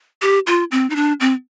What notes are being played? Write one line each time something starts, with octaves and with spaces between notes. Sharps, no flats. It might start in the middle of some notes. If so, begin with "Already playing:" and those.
G4
F4
C4
D#4
D4
C4